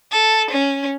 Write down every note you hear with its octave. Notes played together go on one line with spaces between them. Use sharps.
A4
C#4